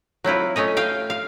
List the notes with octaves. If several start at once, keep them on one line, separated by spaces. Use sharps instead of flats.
F#3 C4 E4 F4
A3 C#4 C#5 D#5
F5 G5
F5